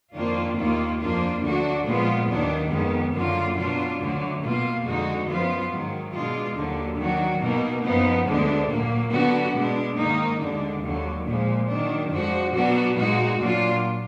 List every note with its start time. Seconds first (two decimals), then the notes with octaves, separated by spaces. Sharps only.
0.15 F2 D#3 A#3 D4 F4
0.58 D#2 D#3 A#3 F4
1.00 F2 F3 A#3 D4 F4
1.43 D2 D3 F#3 D4 F#4
1.87 A#2 F3 G#3 B3 F4
2.28 D#2 D#3 F#3 D4
2.71 F2 D#3 G#3 B3
3.14 F#2 D3 F#3 A#3 F4
3.57 B2 F#3 D4 F4
4.00 D2 D3 F#3
4.42 B2 A#3 F4
4.85 F2 D3 G#3 D#4 F#4
5.28 F#2 F3 B3 F4
5.71 G#2 D#3 F#3
6.13 B2 G#3 D4 F4
6.56 D#2 D3 F#3
6.98 D#3 F#3 D4 F#4
7.41 B2 A#3 D#4
7.84 F#2 F3 B3 D#4
8.27 D2 D3 G#3 B3 D4
8.70 A#2 F#3 A#3
9.12 D3 F#3 B3 D4 F#4
9.55 B2 G#3 B3 D4
9.98 G#2 D#3 A#3 D#4
10.40 D#2 D3 G#3 D4
10.83 D#2 D3 F#3
11.26 A#2 F3 G#3
11.69 D#3 F#3 D4
12.11 F2 F3 G#3 D4 F#4
12.54 B2 F#3 B3 D4 F#4
12.96 A#2 G#3 D#4 F#4
13.40 A#2 F#3 D4 F4